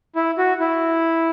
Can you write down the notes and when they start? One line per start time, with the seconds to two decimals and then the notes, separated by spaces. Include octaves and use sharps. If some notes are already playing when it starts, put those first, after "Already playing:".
0.15 E4
0.38 F#4
0.60 E4